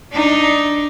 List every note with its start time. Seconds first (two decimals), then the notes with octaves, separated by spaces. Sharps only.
0.12 D4 D#4